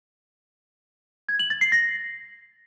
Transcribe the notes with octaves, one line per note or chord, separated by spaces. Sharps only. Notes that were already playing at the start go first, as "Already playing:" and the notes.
G#6
F#7
A6
C7
A#6